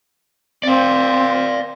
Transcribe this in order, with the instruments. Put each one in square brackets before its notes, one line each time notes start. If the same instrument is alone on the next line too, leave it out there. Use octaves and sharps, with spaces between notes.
[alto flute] C4 [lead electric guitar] D5 F5